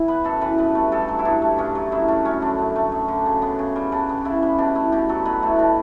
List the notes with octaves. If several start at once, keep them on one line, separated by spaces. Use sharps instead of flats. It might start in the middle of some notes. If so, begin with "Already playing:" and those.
Already playing: E3 E4
B3 B4
F#2 A4
E3 B4
G2 B4
A3
G2 A4
F#3
E4
G2 D4
A3
G2 C#4
F#3
F#2 E4
A3 D4
F#2 C#4
D3 D4
F#2
A3
F#2
D3
C#3
B3
C#3
G3
C#3 D4
B3
C#3 E4
G3
B2 D4
A3 E4
B2 G4
F#3 A4
B2 B4
A3 E4
B2 D4